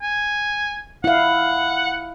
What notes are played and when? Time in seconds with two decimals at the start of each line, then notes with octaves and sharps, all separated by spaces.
0.02 G#5
1.04 E4 F5 F#5